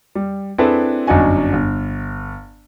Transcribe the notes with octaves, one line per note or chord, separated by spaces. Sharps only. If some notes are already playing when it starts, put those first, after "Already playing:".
G3
C4 D4 E4 G#4 A4 B4
G1 F#2 D4 D#4 F#4 G#5
G1